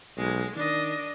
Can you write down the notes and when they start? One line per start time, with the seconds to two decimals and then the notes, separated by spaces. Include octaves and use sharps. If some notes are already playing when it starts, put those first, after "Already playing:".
0.17 B1 G#3
0.56 D#3 D4 D#5